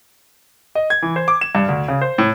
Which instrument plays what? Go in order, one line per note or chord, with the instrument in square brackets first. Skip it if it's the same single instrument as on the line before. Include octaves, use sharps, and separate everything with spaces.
[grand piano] D#5
G#6
E3
C5
D6
E7
G2
D2
C#3
C5
A2